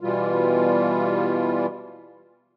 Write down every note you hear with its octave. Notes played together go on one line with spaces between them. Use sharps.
B2 E3 G3 F4